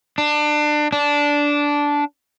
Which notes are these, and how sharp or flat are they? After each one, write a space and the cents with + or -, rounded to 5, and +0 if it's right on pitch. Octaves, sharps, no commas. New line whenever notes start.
D4 +25
D4 -10